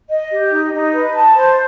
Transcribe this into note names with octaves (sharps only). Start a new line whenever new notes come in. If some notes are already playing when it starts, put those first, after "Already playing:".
D#5
G4
D#4
D#4
B4
A5
C5